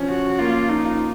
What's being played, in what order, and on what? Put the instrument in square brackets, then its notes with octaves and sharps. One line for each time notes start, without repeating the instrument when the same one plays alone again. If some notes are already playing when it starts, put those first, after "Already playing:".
Already playing: [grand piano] F3 C#4
[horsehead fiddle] F#4
[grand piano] A#3 [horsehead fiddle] F4
[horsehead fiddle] D#4
[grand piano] F4